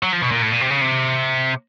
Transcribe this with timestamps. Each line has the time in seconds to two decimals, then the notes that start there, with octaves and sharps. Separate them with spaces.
0.03 F#3
0.13 F3
0.21 B2
0.31 A#2
0.42 A2
0.52 A#2
0.61 C3
0.70 C#3
0.81 C3